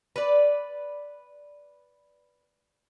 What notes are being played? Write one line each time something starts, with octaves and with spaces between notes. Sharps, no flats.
B4 D5